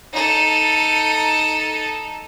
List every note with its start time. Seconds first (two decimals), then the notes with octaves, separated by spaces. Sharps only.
0.13 D#4 A4